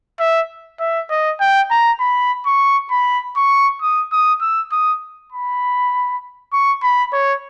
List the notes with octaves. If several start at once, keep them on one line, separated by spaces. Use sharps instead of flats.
E5
E5
D#5
G5
A#5
B5
C#6
B5
C#6
D#6
D#6
E6
D#6
B5
C#6
B5
C#5